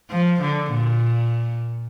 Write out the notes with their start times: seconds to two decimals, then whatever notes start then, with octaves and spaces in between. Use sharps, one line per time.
0.10 F3
0.41 D3
0.71 A#2